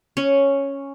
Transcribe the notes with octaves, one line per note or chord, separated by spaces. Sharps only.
C#4